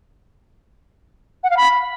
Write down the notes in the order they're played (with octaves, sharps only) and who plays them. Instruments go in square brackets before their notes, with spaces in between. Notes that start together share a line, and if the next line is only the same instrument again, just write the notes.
[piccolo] F#5
F5
B5